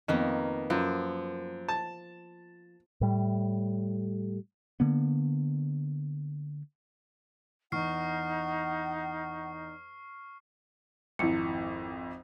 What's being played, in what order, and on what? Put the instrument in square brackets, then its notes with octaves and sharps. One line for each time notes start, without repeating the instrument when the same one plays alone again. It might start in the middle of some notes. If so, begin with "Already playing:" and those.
[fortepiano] F2 [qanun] D#3 A#3 B3
[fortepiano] F#2 [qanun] F3
[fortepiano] A5
[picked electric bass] A2 G3
D3 A#3 B3
[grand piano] E2 [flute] D#4 [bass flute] F#5 [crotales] C#6 F6 C7
[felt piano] G#1 F2 [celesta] E4 C#7